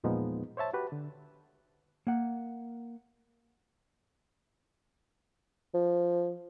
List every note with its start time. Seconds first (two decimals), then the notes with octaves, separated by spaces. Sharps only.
0.04 E2 A#2 F3 G#3 B3 D#4
0.57 C5 C#5 E5 A5
0.73 F#4 G4 B4
0.92 D3
2.07 A#3 F#5
5.74 F3